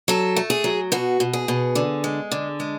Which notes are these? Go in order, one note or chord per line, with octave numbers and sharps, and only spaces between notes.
F#3 A4
A3
G#4
F#3
B2 F#4
B2
G#4
B2
D3
G#3
D3
G#3